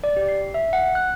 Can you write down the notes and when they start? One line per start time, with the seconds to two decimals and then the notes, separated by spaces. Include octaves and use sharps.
0.04 D5
0.17 G4
0.29 C7
0.54 E5
0.73 F#5
0.95 F#6